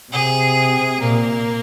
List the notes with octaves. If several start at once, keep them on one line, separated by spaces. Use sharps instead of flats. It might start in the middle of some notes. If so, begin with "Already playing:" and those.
C3 G#4
A#2 A#3